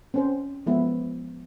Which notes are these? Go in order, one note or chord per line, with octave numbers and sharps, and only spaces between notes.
C4 C#4 C5
F3 G#3 B3 E4